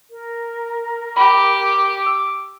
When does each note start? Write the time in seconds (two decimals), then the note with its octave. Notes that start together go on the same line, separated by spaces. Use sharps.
0.11 A#4
1.17 G4 B5 D6
2.06 E6